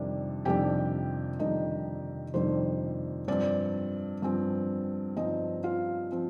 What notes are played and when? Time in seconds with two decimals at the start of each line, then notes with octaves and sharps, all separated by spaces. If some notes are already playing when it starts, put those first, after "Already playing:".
Already playing: F2 C3 D#3 G3 D4
0.45 F2 C3 D#3 G3 D4 G4 G5
1.39 F2 C3 D#3 G3 D4 D#4 D#5
2.34 F2 C3 D#3 G3 D4 C5
3.28 G2 F3 C4 D5
4.22 G2 F3 C4
5.16 G2 F3 C4 D#4 D#5
5.64 F4 F5
6.12 F3 C4